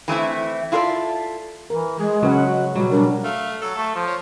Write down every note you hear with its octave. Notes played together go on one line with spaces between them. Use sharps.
E3 A3 C4 E4
E4 F4 A4 A#4 D5
E3 A#4
G#3 G#4
C#3 F#3 C#4 B4 F#5
F#4
B2 F#3 G3
G3 D4 A#4
A3 F5
F#3 A4
A3
F3
C#5